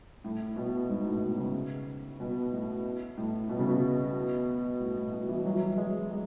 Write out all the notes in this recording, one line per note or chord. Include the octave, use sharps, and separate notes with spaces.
A2
B2
G#2
A2
B2
C#3
B2
A2
A2
B2
C#3
B2
A2
A2
B2
E3
F#3
E3
F#3
G#3
G#3